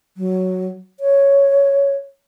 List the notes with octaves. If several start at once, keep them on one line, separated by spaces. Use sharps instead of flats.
F#3
C#5